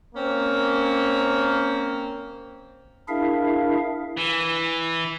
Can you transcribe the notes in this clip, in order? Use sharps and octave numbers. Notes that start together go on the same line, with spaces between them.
A#3 C4 C#4
D4 E4 G#4 A#4 E5 F5
E3